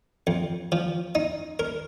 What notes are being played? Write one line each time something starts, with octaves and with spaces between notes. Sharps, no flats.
F2
F3
D#4
A#4